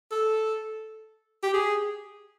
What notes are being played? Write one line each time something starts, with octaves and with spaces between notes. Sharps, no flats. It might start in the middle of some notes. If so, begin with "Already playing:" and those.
A4
G4
G#4